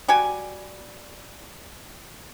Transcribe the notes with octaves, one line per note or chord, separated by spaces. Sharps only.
G3 F#4 G5 G#5